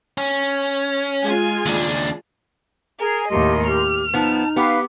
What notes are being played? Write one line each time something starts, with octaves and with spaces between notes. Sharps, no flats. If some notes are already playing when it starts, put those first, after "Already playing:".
C#4
G#3 F4 G#5
D#2 D4
G#4 A#4 G#5
D#2 A2 G4 A#4 D#5 C6
G4 F6
F3 B3 D#4 A5
B3 G4 B4 F5